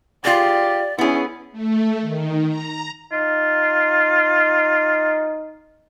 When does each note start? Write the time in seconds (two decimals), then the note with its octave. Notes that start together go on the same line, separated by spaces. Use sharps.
0.25 F4 G4 G#4 D5
0.98 B3 C#4 E4 G#4
1.52 A3
2.01 D#3
2.47 A#5
3.12 D#4 F4